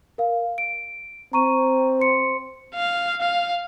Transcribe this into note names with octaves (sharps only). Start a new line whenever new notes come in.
A#4 F5
D7
C4 A#5 C#6 D#7
C5 C6 C#7
F5
F5